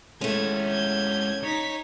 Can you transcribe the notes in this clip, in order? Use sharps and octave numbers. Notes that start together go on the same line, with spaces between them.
G#3 A3 C#4 E4 G#6
G6 G#6
D#4 C#5 B6